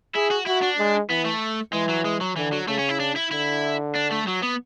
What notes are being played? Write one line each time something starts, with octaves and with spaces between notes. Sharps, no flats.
E4 G#4
F#4
E4 F#4
D4
G#3
E3 B3
A3
E3 G#3
F#3
G#3
F#3
D3 E3
F#3
C#3 A3
C#4
E4
D4
E4
D3 E4
D4
A3
F#3
B3